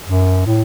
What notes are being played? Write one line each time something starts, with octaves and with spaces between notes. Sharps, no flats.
F#2
A2